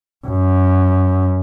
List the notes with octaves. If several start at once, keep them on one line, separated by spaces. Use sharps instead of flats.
F#2